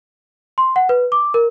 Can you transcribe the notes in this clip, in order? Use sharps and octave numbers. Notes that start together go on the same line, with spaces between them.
C6
F#5
B4
D6
A#4